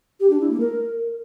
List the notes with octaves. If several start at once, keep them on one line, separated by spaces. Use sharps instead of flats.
G4
D4
E4
A#3
A#4